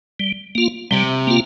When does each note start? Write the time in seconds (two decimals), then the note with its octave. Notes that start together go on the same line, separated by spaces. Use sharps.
0.20 G3
0.55 A#3 F4
0.91 C3 G3
1.27 A#3 F4